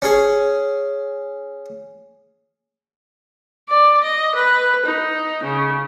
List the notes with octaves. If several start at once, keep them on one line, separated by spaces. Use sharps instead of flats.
C#4 G#4
D5
D#5
B4
D#4
C#3